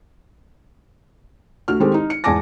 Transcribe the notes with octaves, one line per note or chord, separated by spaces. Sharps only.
D2 F#4 F6
D#3 G#3 C4 G4 A4
D#4
C#7
E2 G#2 G#5 A5 D6 A#6